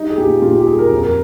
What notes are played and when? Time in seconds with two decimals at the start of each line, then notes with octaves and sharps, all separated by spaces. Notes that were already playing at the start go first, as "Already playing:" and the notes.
Already playing: G3 D#4
0.10 G#4
0.17 A#2 G4
0.42 A#2 F4
0.55 G4
0.67 G3 G#4
0.79 A#4
0.91 F2
1.03 A#4